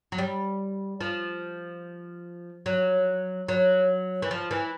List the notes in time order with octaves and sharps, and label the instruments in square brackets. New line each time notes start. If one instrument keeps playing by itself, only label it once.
[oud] F#3
G3
F3
F#3
F#3
E3
F3
E3